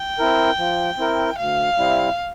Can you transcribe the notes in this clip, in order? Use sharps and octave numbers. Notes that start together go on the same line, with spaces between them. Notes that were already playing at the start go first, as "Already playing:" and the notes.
Already playing: G5
C4 E4 A#4
F3
C4 E4 A#4
D2 F5
C3 G3 C4 E4